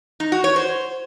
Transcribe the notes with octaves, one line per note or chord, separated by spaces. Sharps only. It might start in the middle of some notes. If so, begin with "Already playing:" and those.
D#4
F#4
C#5
C5